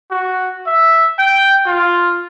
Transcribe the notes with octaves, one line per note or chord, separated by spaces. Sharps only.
F#4
E5
G5
F4